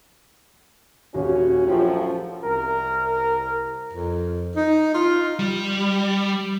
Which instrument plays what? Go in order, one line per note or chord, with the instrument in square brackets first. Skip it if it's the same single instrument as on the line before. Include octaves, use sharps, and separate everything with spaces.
[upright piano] D#1 [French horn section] C#4 F#4
[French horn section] F#2 A2 F3 [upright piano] C#4 F4 G4
[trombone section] C2 A#4
[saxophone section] F2
D#4
F4
[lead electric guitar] G3